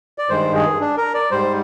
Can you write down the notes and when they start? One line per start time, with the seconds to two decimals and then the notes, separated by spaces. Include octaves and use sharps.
0.18 D5
0.30 G2 D#3 G#3 C5
0.55 G#4
0.80 D4
0.97 A#4
1.14 D5
1.31 G#2 G3 C5